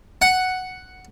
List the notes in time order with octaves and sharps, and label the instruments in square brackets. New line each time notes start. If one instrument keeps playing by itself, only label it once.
[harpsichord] F#5